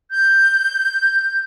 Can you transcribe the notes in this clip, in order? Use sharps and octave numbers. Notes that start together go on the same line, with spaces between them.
G6